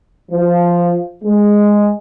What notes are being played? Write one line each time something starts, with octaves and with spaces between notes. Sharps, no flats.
F3
G#3